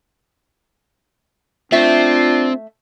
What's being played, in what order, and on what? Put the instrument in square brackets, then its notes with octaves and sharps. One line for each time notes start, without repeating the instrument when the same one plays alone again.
[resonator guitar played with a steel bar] A3 E5 [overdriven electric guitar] C4 [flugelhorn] D4 [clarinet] F4